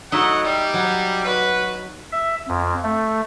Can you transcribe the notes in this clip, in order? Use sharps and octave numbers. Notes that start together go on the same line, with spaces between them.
A2 F#3 D#4 E5 F#5
G3
F#3
F#4 B4
E5
F2
A3